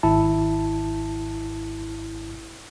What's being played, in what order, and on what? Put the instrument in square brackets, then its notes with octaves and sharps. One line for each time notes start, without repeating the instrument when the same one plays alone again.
[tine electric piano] G#1 E4 A5